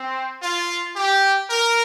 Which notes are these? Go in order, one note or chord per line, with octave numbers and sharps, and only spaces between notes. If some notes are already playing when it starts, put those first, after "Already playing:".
Already playing: C4
F4
G4
A#4